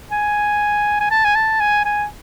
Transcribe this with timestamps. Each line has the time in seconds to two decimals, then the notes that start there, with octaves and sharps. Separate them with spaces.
0.11 G#5
1.00 G#5
1.11 A5
1.24 G#5
1.35 A5
1.60 G#5
1.85 G#5